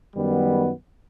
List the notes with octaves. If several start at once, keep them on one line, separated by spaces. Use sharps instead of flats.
F#2 D#3 G3 B3